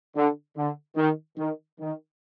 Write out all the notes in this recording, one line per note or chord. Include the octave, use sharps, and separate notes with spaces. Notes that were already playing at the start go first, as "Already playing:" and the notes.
D3
D3
D#3
D#3
D#3